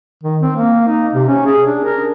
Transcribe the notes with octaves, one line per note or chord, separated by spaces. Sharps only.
D#3
C4
A#3
D#4
C3
C#4
G#4
D4
A#4